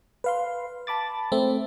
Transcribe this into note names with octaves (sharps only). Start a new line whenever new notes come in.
B4 F5 C6
A5 B5 D6 A6
A3 C4 E5